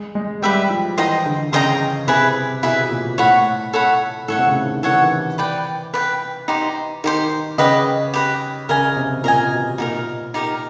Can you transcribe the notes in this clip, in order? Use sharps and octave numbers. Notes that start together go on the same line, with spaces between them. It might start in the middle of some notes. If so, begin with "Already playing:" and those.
Already playing: G#3
G#3
G3 G4 B4 E5 G5
F3
E3 C5 D#5 G5 A#5
D3
C#3 C5 D#5 G5 A#5
C3 E4 G#4 B4
B2 E4 G#4 B4
A#2
A2 A4 C#5 F#5 B5
A4 C#5 F#5 B5
A2 A4 C#5 F#5
C3
C#3
D#3
E3 A4 C#5 F#5
D#3
E3
B4 D5 G5
B4 D5 G5
D#4 G4 C5
D#3 D#4 G4 C5
C#3 G4 B4 D#5
G4 B4 D#5
C#3 A#4 D#5 G#5
C3
A#2 A#4 D#5 G#5
B2
A#2 D#4 G4 A#4
D#4 G4 A#4